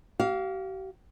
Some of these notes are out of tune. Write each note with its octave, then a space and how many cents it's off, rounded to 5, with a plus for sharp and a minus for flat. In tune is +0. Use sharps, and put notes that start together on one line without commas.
G4 -45 F5 +0